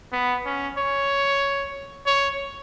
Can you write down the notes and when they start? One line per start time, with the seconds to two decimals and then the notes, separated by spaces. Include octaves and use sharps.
0.12 B3
0.45 C#4
0.78 C#5
2.06 C#5